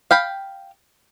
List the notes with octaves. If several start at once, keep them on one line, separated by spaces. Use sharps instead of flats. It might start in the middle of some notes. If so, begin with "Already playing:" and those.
F5 G5 B5